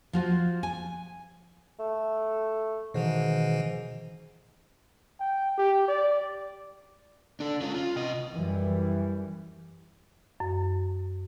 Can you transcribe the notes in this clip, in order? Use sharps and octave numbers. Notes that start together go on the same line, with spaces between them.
F3 F4 F#4
G#5
A3
G#2 B2 D#3 E3
G5
G4
D5
D4 A4
C#4 F4
F4
C3 D#5
F#2 E3 G3
F#2